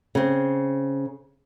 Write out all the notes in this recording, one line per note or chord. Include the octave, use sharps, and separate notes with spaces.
C#3 C4